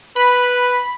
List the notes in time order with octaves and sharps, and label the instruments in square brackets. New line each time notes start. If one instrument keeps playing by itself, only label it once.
[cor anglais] B4 [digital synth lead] B5